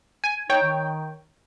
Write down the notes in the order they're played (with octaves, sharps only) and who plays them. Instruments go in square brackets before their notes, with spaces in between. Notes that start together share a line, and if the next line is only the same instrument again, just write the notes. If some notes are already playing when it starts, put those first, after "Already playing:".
[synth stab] G#5
[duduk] D#4 [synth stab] C#5 G5
[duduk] D#3